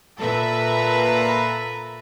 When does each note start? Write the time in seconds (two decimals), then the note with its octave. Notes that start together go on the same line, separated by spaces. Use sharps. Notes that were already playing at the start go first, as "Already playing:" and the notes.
0.17 A#2 A4 B4 E5 A#5